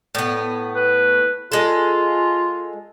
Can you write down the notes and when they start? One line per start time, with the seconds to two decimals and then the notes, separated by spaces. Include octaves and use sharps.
0.15 A2 B3
0.76 B4
1.52 G#3 F4 A4